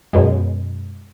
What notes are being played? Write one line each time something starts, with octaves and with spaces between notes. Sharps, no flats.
F#2 B2 G#3